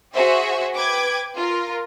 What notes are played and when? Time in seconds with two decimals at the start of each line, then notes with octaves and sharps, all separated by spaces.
0.14 F#4 G#4 C5 E5
0.75 B4 G5 D6 G#6
1.37 F4 A#4